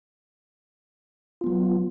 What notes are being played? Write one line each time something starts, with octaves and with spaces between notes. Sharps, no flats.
F#3 B3 F4